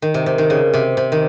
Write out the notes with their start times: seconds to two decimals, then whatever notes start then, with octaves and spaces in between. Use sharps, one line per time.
0.02 D#3
0.14 C3
0.26 C3
0.38 D#3
0.50 C#3
0.74 C3
0.97 C3
1.12 D#3